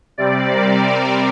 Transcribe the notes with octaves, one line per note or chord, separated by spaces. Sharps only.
C3 G3 C4 D5
A#4